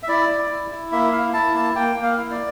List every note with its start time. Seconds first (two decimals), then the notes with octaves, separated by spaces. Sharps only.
0.03 E5
0.08 E4 D5
0.29 E4
0.50 E4
0.71 E4
0.92 A#3 E5
1.12 E4 F5
1.34 E4 A5
1.54 A#3 A5
1.75 A#3 G5
1.96 A#3
2.03 F5
2.17 E4
2.31 D5